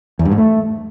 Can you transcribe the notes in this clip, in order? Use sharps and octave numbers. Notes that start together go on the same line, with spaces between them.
E2
G2
G#2
A3